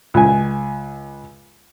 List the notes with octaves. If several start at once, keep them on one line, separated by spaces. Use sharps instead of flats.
C#2 G#5